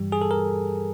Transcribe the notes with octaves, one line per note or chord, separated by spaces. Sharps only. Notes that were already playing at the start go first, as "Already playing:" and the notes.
Already playing: G2 E3 G3 G4
G#4
A4
A#4